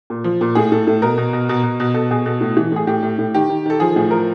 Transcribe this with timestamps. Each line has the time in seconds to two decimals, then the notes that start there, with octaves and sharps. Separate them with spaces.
0.10 A#2
0.24 F3
0.41 A#2
0.55 A2 G#4
0.72 A2 A4
0.87 A2 A4
1.02 B2 A#4
1.18 B2
1.33 B2
1.49 B2
1.63 B2
1.80 B2
1.94 B2 A4
2.11 B2 G#4
2.25 B2 A4
2.41 A2
2.57 E3
2.72 A2 G#4
2.87 A2 G4
3.03 A2
3.19 A2
3.34 D#3 G4
3.50 D#3
3.66 D#3 A4
3.80 F3 G#4
3.96 A2 G#4
4.11 F3 A#4